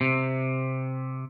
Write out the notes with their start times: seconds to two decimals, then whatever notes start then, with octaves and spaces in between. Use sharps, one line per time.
0.01 C3